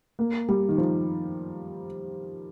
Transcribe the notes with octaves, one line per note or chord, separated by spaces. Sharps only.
A#3
G3
D#3
F3